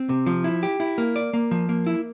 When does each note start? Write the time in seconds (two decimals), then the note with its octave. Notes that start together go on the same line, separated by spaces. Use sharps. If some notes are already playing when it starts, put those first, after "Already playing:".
Already playing: C4
0.09 C3
0.26 F3
0.44 E4
0.63 G4
0.80 E4
0.98 A#3
1.16 D5
1.33 A#3
1.51 F3
1.69 A#3
1.87 E4